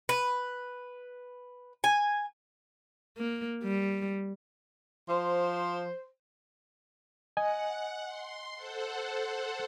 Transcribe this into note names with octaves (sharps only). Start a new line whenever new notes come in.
B4
G#5
A#3
G3
F3 C5
D#5 F#5 G#5
C6
A4 C5 F#5